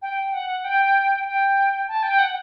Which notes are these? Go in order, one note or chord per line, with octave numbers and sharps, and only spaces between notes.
G5
F#5
G5
G5
A5
G5
F#5